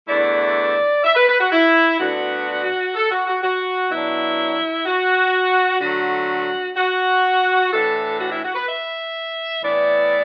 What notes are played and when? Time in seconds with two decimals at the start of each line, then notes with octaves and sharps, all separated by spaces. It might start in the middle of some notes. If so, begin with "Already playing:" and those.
0.08 E2 D3 A3 E4 D5
1.04 E5
1.15 B4
1.28 B4
1.39 F#4
1.52 E4
1.99 D2 D3 B3 D4 F#4
2.95 A4
3.11 F#4
3.27 F#4
3.42 F#4
3.90 B2 F#3 D4 E4
4.86 F#4
5.81 D3 F#3 A3 F#4
6.76 F#4
7.71 A2 E3 D4 A4
8.20 F#4
8.31 E4
8.44 F#4
8.55 B4
8.67 E5
9.62 A2 E3 B3 E4 D5